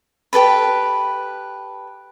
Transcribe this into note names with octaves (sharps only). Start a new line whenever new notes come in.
G4 A4 B4 B5